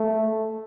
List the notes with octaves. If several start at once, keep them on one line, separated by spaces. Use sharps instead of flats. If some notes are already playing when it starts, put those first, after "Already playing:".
Already playing: A3